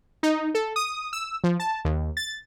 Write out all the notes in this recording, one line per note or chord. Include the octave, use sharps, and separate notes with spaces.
D#4
A4
D#6
E6
F3
A5
D#2
A6